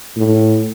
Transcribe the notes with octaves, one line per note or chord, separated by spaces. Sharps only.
A2